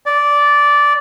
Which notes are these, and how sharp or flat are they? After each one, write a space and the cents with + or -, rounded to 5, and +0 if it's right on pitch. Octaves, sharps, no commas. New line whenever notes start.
D5 -10